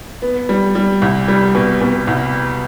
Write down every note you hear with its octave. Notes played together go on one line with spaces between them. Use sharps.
B3
G3
G3
C2
G3
B2
B2
C2